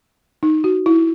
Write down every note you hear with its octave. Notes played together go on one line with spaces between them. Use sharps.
D#4
F#4
E4